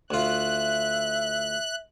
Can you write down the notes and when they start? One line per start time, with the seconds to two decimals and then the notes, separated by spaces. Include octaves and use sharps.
0.11 D2 F4 E5 F#6